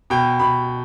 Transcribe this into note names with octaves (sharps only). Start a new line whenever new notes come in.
B2 G5
B2 B5